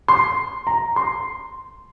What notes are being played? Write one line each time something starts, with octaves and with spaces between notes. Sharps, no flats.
C6
A#5
C6